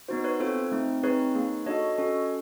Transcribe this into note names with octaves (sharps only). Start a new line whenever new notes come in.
B3 D#4 F#4 C5
B4 C#5
C4 F4 A4 C5
A3 C4 D#4
C4 D#4 G#4 B4 C#5
A#3 D#4 G#4
D4 F#4 A4 C#5 D#5
C#4 F#4 A4